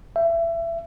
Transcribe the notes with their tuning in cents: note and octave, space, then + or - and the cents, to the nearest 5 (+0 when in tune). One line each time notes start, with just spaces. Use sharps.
E5 +25